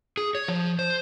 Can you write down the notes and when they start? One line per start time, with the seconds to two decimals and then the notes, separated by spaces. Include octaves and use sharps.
0.17 G#4
0.35 C#5
0.48 F3
0.79 C5